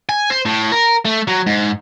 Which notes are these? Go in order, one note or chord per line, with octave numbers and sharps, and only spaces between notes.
G#5
C5
A2
A#4
A3
F#3
G#2